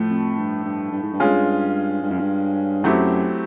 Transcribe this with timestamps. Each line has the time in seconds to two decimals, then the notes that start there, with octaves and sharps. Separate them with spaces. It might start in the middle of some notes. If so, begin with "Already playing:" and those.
Already playing: A2 F3 A3
0.10 F2
0.38 G2
0.64 G2
0.92 G2
1.03 G#2
1.13 G2
1.20 G#3 C#4 F4 G#4
2.02 G2
2.11 F#2
2.20 G2
2.83 F#2 F#3 A3 C4 E4 G4